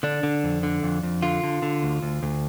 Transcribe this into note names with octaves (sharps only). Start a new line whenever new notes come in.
D3 D4
D3
F2
D3
F2
F2
D3 F4
D3
D3
D2
D2
D2